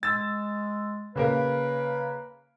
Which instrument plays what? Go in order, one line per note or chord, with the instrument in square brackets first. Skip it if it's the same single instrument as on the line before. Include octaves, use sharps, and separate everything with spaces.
[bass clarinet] G#3 [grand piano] E6 A6
[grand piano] C#3 A#3 A#4 [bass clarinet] B4